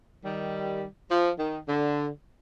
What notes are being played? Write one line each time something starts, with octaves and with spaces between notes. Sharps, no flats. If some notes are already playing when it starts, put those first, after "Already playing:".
D#3 G3
F3
D#3
D3